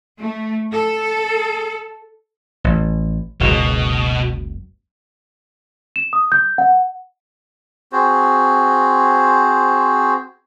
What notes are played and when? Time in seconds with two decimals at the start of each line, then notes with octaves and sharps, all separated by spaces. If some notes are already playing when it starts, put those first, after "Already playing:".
0.19 A3
0.72 A4
2.64 A1
3.40 F#1 C#2 B2
5.96 E7
6.13 D#6
6.32 G6
6.58 F#5
7.92 C4 F#4 G#4 C5